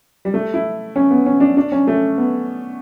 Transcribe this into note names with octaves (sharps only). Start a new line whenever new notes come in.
G3
A3
E4
C#4
B3
C#4
D4
D4
C#4
A3
B3